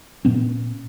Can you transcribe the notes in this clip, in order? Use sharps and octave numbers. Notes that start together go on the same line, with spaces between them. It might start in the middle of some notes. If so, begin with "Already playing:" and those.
A#2 B3 C#4